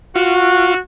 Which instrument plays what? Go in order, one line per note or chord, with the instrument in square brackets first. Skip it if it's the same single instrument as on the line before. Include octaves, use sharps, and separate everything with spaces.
[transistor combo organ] F4 [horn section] F#4